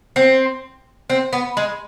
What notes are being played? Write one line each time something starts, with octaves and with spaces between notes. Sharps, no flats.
C4
C4
B3
G#3